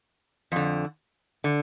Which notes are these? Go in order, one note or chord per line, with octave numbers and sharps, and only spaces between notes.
F2 D3
D3